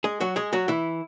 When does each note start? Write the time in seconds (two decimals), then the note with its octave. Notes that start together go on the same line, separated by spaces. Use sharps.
0.04 G#3 G#4
0.20 F#3 F#4
0.36 G#3 G#4
0.53 F#3 F#4
0.68 E3 E4